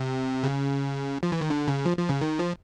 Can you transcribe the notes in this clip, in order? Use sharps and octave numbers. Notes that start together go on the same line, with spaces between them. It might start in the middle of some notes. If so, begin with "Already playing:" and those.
Already playing: C3
C#3
F3
E3
D#3
D3
C#3
F3
F3
C#3
D#3
F3